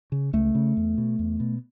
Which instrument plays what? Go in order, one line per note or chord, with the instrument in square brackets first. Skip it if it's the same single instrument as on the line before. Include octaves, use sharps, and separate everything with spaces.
[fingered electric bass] C#3
C#2 A3
C#3
E2
B2
E2
B2